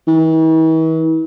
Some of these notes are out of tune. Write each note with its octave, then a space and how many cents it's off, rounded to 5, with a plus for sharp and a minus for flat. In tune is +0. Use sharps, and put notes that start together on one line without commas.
E3 -45